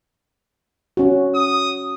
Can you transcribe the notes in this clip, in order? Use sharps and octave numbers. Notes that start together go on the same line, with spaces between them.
C#4 F#4
D#6